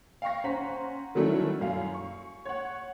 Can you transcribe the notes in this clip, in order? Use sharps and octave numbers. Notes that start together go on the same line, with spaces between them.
F5 G5 C#6 A#6
C#4 C5 F#5 A#5 B6
D#3 F#3 G3 A3 C#4 E4
F#2 F5
C#6
C#5 F#5